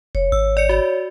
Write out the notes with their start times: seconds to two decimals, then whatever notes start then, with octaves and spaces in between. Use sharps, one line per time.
0.15 F1 C#5
0.32 G#1 E6
0.57 D5 C#7
0.69 F#4 D5